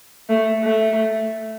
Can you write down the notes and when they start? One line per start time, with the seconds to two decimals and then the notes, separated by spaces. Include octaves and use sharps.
0.29 A3
0.64 A3